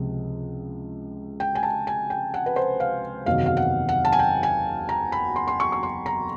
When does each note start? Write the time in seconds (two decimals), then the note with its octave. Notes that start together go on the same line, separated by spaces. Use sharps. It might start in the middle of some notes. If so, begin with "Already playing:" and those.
Already playing: C#2 C3 F3
1.40 G5
1.55 G#5
1.63 A5
1.87 G#5
2.10 G5
2.34 F#5
2.46 B4
2.56 C5
2.80 F5
3.26 F#1 E2 C3 D#3 F#3 F5
3.46 F5
3.57 F#5
3.89 F#5
4.05 A5
4.13 G#5
4.19 G5
4.43 G#5
4.89 A#5
5.12 B5
5.36 C6
5.48 C6
5.60 C#6
5.72 C#6
5.83 C6
6.06 A#5